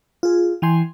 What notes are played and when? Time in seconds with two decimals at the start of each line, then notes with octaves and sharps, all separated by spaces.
0.23 F4 G#4
0.62 E3 G5 G#5 C6